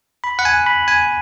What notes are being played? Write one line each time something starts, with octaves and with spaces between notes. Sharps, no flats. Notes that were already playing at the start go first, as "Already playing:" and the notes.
B5
F#5
G#5
B5
G#5